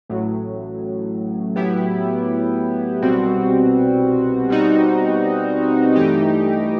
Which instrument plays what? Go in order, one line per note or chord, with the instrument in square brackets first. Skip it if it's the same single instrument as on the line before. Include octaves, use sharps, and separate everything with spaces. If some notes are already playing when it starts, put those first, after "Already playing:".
[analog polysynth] A1 A2 F#3
A2 F#3 B3 E4 G4
C2 B2 G3 C4 F#4
B2 G3 C4 D#4 F#4
G2 E3 A3 D#4 G4